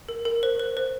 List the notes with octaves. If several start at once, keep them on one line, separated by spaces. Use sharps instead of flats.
A#4
A#4
C5
C5
C5